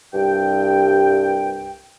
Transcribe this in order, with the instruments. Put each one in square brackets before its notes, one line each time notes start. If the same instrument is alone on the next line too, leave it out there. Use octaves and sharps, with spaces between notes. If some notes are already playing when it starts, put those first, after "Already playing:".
[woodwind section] C2 G2 G5